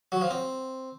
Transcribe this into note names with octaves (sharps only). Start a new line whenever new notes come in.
F#3
F3
C4